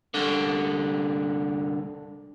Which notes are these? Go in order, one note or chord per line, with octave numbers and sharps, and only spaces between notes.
C2 D3